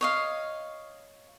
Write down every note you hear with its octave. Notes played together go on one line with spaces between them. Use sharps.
C#5 D#5 F5